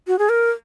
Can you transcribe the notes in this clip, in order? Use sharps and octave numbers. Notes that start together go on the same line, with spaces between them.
F#4
G#4
A#4